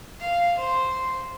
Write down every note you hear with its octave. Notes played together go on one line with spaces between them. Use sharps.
F5
C5